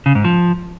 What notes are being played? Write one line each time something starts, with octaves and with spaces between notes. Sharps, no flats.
C#3
G#2
F3